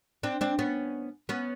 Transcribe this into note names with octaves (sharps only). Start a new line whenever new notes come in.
C4 D4
C4 D4
B3 C#4
B3 C#4